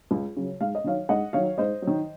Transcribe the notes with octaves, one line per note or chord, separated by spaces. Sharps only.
C#2
C#3 F#3
G#2 F5
D#5
D#3 F#3 C#5 F5
G#2 D#5 F#5
D#3 F#3 C#5 F5
G#2 C5 D#5
F#3
D#3